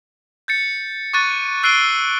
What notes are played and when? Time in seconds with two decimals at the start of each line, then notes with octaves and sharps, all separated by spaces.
0.48 G6 A6 C#7
1.13 C#6 D6 F#6 A6 D#7
1.63 E6 F#6 C7 D7 D#7 G7
1.82 E6